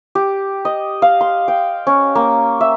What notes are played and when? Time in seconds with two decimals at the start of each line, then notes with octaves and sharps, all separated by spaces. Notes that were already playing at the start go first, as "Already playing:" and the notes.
0.15 G4
0.65 D#5
1.02 F5
1.21 C6
1.48 G5
1.87 C#4
2.15 A#3
2.61 E5